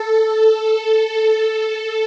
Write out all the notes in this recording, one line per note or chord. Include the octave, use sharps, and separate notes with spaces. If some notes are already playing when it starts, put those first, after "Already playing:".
Already playing: A4
A4